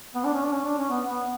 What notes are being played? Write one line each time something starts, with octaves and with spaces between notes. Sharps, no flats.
B3
D4
C#4
D4
C#4
D4
C#4
B3
B3